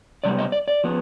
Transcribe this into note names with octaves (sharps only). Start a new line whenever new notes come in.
C3 G3 B3 D5
D#5
D5
D5
F3 B3